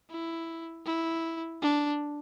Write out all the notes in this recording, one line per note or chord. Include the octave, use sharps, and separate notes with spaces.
E4
E4
D4